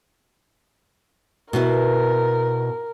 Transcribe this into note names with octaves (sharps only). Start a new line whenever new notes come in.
B2 B3 E4 A#4